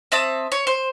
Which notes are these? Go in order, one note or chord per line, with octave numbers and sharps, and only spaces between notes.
C4 E5 A5 D#6
C#5
C5